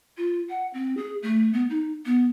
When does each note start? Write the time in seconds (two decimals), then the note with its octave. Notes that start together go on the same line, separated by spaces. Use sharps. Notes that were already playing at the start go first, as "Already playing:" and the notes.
0.18 F4
0.49 F#5
0.74 C4
0.97 G#4
1.23 A3
1.53 B3
1.70 D#4
2.06 B3